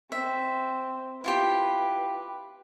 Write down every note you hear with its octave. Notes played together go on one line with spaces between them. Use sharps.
C4 E5
E4 F4 G4 B4